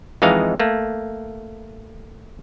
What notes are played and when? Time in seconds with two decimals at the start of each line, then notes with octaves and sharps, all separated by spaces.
0.22 F2 E3 G#3 D#4 F5
0.60 A3 A#3